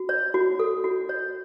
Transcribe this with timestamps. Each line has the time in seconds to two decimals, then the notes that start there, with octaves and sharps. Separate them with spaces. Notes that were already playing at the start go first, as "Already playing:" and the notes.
Already playing: F#4
0.09 C#5
0.34 F#4
0.59 A4
0.84 F#4
1.09 C#5